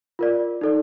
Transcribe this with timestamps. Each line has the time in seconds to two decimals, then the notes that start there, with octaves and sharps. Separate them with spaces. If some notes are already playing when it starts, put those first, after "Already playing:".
0.19 F4 A#4 D5
0.61 D#4 A4 D5